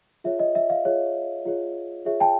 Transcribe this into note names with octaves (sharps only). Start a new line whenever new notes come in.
F4 G#4 C#5 E5
D#5
E5
D#5 F5
F4 G#4 C#5
F4 G#4 C#5
F4 G#4 C#5 E5
G5 A5